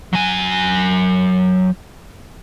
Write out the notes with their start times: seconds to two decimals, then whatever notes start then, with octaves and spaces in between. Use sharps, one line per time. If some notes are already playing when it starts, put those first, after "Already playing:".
0.13 F#3 G#5